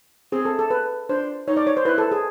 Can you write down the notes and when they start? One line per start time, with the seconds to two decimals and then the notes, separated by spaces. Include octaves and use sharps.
0.32 C4 G#4
0.45 A4
0.59 A4
0.70 B4
1.09 D4 C5
1.48 D#4 C#5
1.57 D5
1.67 C#5
1.77 C5
1.85 E4 B4
1.98 A4
2.12 G#4